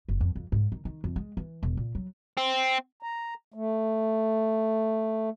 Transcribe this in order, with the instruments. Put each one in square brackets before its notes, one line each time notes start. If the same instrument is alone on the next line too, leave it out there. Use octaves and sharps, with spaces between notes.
[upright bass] F#1
F2
F2
G#2
D#3
D#3
F2
G#3
E3
E1
A#2
F#3
[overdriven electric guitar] C4
[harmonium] A#5
A3